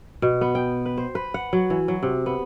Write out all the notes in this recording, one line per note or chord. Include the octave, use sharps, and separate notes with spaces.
B2
B3
G5
B4
C5
B4
F#5
F#3
E3
F#3
C3
B3